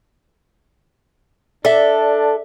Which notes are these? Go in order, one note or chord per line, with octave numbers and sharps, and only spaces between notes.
D4 A4 D5 E5